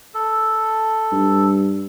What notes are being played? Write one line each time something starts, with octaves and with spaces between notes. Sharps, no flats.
A4
G2